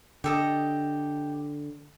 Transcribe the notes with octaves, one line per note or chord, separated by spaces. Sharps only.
D3 G4 A4 D#5